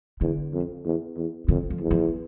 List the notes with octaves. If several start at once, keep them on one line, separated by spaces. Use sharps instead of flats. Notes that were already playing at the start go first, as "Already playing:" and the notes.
E2 D3
F2
E2
E2
F2 D3
F3
E2
F3